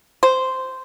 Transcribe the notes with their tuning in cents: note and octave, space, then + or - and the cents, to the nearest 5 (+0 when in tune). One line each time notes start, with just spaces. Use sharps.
C5 -10